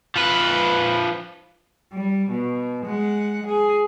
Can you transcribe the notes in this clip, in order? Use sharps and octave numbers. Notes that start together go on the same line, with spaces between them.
F3 B4
G3
B2
G#3 F#5
G#4